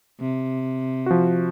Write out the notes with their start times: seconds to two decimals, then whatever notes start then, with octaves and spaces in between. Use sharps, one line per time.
0.20 C3
1.06 F3 F#4